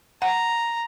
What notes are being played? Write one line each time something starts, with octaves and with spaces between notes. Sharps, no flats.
F#5 A#5